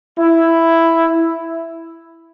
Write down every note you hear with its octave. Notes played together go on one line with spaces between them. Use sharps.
E4